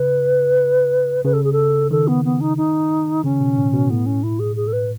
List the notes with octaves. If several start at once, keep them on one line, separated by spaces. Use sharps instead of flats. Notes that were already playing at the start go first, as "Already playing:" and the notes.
Already playing: C#3 B4
C#3 B4
A4
G#4
A4
D#3 A4
B3
B3
D#4
D#4
C#3 C#4
B2
A2
B2
A2 B3
C#4
E4
G#4
G#4
A4
B4